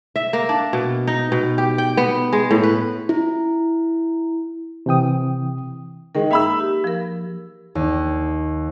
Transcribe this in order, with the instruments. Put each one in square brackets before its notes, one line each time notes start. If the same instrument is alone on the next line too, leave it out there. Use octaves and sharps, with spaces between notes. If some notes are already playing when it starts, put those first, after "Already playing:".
[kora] E5
A#3
D4
B2
D#4
B2
G4
G5
B3
G#3
A2
B4
[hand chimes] E4
[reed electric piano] C3 E3 G5 D#6
[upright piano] D#3 G#3 [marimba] A#4
[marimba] A#3 D#4 G#4 [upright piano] E5 B5 E6
[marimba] G4
F3 A#4
[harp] D#2